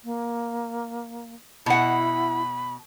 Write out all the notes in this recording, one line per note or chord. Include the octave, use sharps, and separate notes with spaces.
A#3
B2 E4 F#5 B5